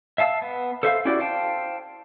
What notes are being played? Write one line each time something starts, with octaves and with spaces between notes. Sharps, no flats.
E5 F5 A5 E6
B3
A4 C5 E5 F5
C#4 E4 F#4 G4 D5
C5 F5 G5 A5